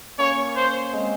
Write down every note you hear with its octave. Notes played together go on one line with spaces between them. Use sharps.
A#3 C#4 C#5
C5
G#3 C4